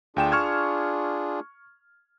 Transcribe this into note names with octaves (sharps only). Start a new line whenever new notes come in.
D2 D4 F4 G#4 G5 E7
C#6 F6 G#6